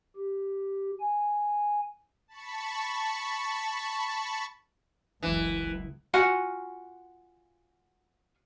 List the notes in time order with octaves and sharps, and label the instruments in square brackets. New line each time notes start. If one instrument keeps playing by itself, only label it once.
[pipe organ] G4
G#5
[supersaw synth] A5 B5 C#6
[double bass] F#1 C#2 [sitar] E3
[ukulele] F4 F#4 F#5 G#5